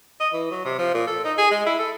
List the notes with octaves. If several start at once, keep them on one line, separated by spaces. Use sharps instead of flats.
D#5
E3
F#3
C3
F3
A#2
A4
D#4
G#4
G#3
E4
A4